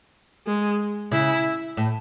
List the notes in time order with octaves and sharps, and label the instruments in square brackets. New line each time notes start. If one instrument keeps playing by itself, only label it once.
[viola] G#3
[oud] C#3 [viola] E4
[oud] A2